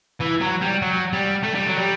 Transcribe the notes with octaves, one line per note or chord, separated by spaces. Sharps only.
E3
F#3
G3
F#3
G3
A3
G3
F#3
G3